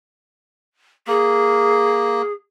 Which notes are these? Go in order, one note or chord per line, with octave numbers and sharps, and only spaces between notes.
A#3 G#4